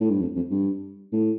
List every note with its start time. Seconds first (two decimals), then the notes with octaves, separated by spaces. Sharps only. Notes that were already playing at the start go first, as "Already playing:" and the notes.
0.01 A2
0.10 G2
0.21 F2
0.36 F2
0.51 G2
1.13 A2